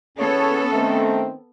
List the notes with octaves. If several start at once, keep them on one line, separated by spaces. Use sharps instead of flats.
E3 B3 C#4 G#4 A4 C#5
D#3 A3 C4